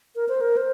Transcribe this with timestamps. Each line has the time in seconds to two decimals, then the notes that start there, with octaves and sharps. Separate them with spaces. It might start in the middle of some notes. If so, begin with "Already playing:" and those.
0.16 A#4
0.29 C5
0.41 A#4
0.57 C5